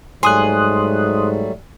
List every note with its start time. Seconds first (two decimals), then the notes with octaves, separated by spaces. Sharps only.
0.23 G#2 F#3 G3 A3 G#5 C6 D#6 F#6